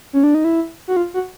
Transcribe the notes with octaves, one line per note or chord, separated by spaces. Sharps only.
C#4
D4
D#4
E4
F#4
F4
F#4